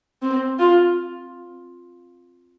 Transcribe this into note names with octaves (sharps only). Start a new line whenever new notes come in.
C4
F4